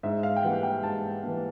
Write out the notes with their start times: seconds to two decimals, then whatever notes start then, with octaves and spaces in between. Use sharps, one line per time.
0.03 G#2 E5
0.23 F5
0.37 G5
0.43 E3 G3 A#3 F#5
0.63 G5
0.83 G#2 A5
1.23 E3 G3 A#3